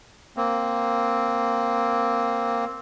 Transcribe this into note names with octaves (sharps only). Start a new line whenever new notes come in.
A#3 C4